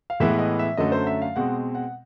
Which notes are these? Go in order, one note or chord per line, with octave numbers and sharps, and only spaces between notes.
F5
A2 E3 G#3 B3 E5
D#5
E5
F#2 D3 F#3 A3 D#5
C5
E5
F5
B2 G#3 C4 F#5
F#5